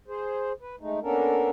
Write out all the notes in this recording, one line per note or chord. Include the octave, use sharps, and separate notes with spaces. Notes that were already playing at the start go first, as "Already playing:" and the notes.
G#4 C5
B4
G#3 A3 D#4
A#3 B3 C#4 D4 A4 A#4